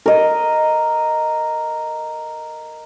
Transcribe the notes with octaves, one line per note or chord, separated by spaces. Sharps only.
A#4 D#5